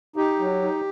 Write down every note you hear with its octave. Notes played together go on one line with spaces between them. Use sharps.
D#4 G4
F#3
D#4